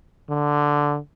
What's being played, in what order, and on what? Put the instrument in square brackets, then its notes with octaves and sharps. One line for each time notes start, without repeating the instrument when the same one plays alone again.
[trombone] D3